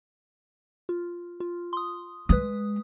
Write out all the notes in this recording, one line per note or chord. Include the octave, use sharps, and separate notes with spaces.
F4
F4
C6 D#6
G#3 B4 D#6